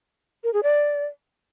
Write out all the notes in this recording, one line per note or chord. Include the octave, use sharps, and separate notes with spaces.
A#4
G#4
D5